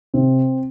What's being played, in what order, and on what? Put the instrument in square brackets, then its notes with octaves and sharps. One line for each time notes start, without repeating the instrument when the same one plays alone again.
[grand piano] C3 C4